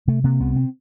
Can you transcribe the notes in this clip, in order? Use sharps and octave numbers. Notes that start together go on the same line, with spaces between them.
C3 A3
C3 A#3
C2 B3
C4